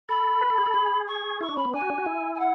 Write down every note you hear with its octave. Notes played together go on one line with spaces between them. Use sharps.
A4 B5
B4
A4
G#4
A4
G#4
C#6
E4 C#6
D4
C#4 B5
B3
D4 G#5
F#4
D4
F#4
E4
G#5
F#5